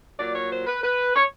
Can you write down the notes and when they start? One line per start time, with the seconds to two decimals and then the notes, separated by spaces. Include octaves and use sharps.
0.18 A#2 F#3 D5
0.34 C#5
0.51 C5
0.67 B4
0.83 B4
1.16 C#5